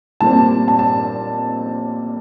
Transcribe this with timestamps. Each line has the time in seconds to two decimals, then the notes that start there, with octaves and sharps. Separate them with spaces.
0.21 A#2 G3 C4 A5
0.68 A5
0.79 A5